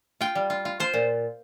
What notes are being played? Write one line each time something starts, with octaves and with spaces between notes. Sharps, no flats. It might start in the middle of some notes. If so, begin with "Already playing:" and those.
F4 G5
G3
F4
F4
F4 C5
A#2